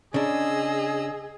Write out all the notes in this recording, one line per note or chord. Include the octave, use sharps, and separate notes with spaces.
C#3 D4 G#4 D#5 E6